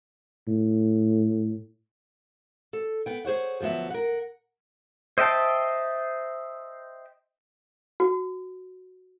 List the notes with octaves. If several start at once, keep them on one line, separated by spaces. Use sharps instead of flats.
A2
A4
B3 G5
G#4 C5 C#5 F#5
D2 F3 F#3 B3 E5
A#4 F#5
C5 D#5 E5 G5 A5
F#4